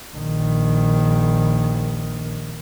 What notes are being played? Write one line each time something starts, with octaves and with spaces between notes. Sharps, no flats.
A#1 D#3